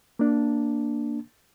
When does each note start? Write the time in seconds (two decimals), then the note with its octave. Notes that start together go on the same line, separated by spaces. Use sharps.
0.19 A#3 D4